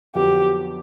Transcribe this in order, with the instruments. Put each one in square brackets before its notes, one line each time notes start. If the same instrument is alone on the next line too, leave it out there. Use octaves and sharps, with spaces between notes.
[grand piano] F2 D3 F#3 B3 [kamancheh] G4